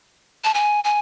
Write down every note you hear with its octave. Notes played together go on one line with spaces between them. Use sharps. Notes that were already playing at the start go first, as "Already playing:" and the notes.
A5
G#5
G#5